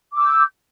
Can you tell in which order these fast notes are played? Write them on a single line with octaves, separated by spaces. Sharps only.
D6 E6 G6